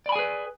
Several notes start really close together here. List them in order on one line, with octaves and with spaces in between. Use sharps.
D5 B5 G#5 G#4 B4